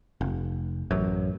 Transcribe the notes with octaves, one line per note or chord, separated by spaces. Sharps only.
F1
A1 F#2